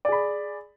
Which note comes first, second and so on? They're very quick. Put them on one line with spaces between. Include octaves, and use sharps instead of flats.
D5 G#4 B5